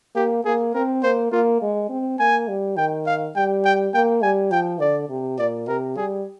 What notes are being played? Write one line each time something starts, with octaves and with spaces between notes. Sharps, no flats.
A#3 G4
A#3 G#4
C4 A#4
A#3 C5
A#3 F4
G#3
C4
A#3 G#5
G3
D#3 G5
F5
G3 G5
G5
A#3 G5
G3 G#5
F3 G5
D3 D5
C3
A#2 D5
C3 A#4
G3 G#4